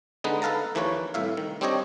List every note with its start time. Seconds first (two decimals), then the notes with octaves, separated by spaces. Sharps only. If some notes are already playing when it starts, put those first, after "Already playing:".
0.24 D3 G#3 B3 D#4 B4
0.42 A4 B4 F5 A5 A#5
0.75 D#2 E3 F3 A#3 B4 C#5
1.14 C2 A2 E5 F5
1.37 D#3
1.61 G3 C4 D4 G4 C#5 D#5